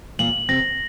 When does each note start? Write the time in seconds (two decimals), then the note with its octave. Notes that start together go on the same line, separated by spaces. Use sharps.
0.19 A#2 A#3 F#7
0.49 C3 C4 A#6